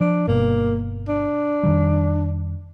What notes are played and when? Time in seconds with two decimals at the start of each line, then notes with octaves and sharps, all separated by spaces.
0.01 F3 D4
0.28 G1 B2 A#3
1.08 D4
1.63 F2 D#3 G3